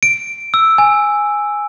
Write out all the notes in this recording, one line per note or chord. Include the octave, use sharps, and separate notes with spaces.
D7
E6
G#5